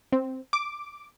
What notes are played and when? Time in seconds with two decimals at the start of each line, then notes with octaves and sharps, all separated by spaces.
0.12 C4
0.53 D6